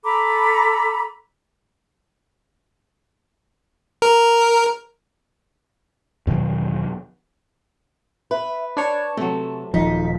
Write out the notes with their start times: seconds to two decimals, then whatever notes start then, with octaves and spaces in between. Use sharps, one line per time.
0.04 A4 A#5 B5 D6
4.02 A#4
6.27 E2 B2 D#3 F#3
8.31 B4 E5
8.77 D4 C#5 A5
9.17 C3 F#3 A3
9.74 D#1 F3 D#4 B6